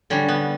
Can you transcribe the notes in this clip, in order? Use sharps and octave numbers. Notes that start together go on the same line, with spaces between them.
D3 G3 C#4
B3